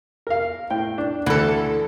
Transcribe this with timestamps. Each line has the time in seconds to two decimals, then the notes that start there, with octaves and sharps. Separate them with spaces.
0.27 A#4 F5
0.70 A2 G5
0.98 D4
1.26 D2 E3 A4